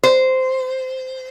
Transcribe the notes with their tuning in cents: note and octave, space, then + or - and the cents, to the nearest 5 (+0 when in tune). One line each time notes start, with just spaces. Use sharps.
C5 -10